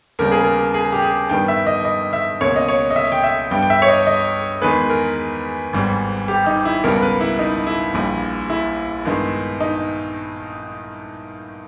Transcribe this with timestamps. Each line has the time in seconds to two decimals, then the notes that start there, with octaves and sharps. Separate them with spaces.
0.19 D#2 C#3 G3 B3 A#4
0.31 G#4
0.44 A#4
0.74 G#4
0.93 G4
1.02 G#4
1.29 G2 D#3 G3 B3 G5
1.48 E5
1.67 D#5
1.85 D#5
2.13 E5
2.41 C#2 B2 A#3 C#5
2.56 D#5
2.68 C#5
2.91 D#5
2.96 E5
3.12 G5
3.24 E5
3.51 G2 G3 B3 G5
3.63 G5
3.70 E5
3.82 C#5
3.88 D#5
4.07 D#5
4.62 E2 D#3 G#3 B3 B4
4.90 A#4
5.73 G#1 G#2 G3 B3
6.28 G4
6.46 D#4
6.65 E4
6.84 C#2 B2 G3 B3 A#4
7.02 B4
7.21 E4
7.39 D#4
7.67 E4
7.94 A#1 A#2 G3
8.50 E4
9.05 G2 D#3 G#3 B3
9.60 D#4